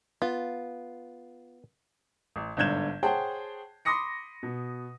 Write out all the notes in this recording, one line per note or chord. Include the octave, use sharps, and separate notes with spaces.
B3 F4
A1
G1 G#2 D3 G6 G#6 E7
G#4 C5 C#5 F#5 G5 A5
B5 C6 D6 D#6 A#6 C#7
B2